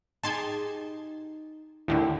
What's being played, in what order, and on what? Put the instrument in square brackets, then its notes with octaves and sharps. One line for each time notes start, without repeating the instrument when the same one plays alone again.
[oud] D#4 G4 G#4 [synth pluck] A5 C6 G#6
[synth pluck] D#2 A2 D3 [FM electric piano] E4 G5